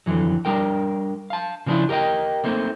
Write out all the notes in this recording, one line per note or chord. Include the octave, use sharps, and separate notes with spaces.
F2 B2 D3 E3 F#3
G3 D4 A#4 G5
F5 A5
C#3 F3 A#3 D4 E4 F4
G4 A#4 C#5 D#5 G5
A3 A#3 C4 D#4